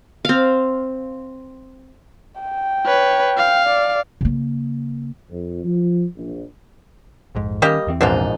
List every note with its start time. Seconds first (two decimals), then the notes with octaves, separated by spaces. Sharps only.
0.25 C4 F5
2.40 G5
2.86 B4 C#5
3.37 F5
3.67 D5
4.21 C#3 A#3
5.30 F2
5.64 F3
6.16 A#1
7.35 A#1 F2 G#2
7.62 D#3 G3 A#3 C#4 G4 D#5
7.87 E2 E3 C4
8.01 A#1 G#2 B2 F3 D4 D#4